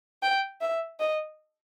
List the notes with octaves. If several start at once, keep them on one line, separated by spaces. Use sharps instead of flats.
G5
E5
D#5